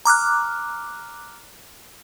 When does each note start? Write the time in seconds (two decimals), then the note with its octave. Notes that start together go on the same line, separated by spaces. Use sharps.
0.05 A#5 D6 F6 F#6